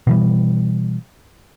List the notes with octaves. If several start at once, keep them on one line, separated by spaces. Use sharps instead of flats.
B2 E3 G3